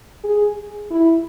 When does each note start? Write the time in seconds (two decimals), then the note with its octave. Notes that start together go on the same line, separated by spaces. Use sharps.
0.24 G#4
0.91 E4